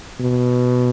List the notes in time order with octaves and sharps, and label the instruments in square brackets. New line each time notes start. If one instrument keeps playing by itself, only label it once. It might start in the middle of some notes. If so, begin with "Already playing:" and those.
[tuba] B2